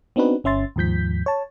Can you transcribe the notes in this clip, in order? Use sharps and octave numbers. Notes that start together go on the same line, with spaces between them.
B3 C4 D4 D#4 F#4 B4
G1 C#4 E5 C6 A6
D#2 G#2 F3 G6 B6
C#5 A5